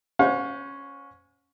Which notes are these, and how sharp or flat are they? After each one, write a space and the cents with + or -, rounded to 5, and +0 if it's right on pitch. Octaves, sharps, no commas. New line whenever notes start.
C#4 +0 C5 -25 F#5 -45